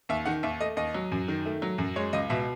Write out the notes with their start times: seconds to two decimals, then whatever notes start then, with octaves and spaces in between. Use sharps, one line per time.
0.09 D#2 E5
0.26 D#3 F#5
0.43 D#2 E5
0.61 A3 D#5
0.77 D#2 D#5
0.94 F#3
1.12 F#2
1.28 D#3
1.46 A3
1.62 F#3
1.78 F#2
1.96 G#3 C#5
2.13 C#2 D#5
2.30 B2 E5